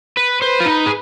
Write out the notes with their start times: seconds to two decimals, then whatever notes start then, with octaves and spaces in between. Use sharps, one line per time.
0.17 B4
0.41 B4 C5
0.60 F4
0.66 D#4
0.86 G#4